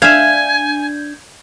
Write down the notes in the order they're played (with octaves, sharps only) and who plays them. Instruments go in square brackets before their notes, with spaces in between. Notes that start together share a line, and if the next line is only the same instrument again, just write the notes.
[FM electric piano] D4 G6 [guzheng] E5 F5 [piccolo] G#5 [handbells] G#6